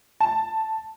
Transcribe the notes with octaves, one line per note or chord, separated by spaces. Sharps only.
A5